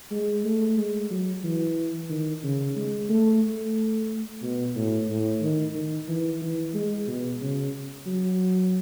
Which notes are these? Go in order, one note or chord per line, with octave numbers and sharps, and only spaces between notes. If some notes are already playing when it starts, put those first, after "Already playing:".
G#3
A3
G#3
F#3
E3
D#3
C#3
G#3
A3
A3
B2
A2
A2
D#3
D#3
E3
E3
G#3
B2
C#3
F#3